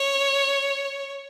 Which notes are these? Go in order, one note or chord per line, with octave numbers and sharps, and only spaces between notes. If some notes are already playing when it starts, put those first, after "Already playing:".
Already playing: C#5